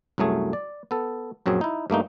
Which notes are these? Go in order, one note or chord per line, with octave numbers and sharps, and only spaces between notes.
C2 F#2 F#3 A3 G#4
D5
B3 A4
A#1 F#2 F#3 C4 G#4
D#4 E4
G2 A3 A#3 D#4